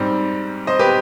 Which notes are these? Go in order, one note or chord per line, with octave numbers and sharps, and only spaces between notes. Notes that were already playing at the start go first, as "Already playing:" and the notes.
Already playing: G#2 G3 C4
C5 D#5
G4 B4